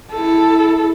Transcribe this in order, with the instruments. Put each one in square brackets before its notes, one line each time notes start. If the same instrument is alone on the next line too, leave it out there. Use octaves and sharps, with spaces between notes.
[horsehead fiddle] E4 A4